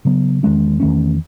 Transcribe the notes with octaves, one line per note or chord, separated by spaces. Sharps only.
C#3 F#3 B3
E2 D#3 G#3 C#4
E2 D#3 A3 C#4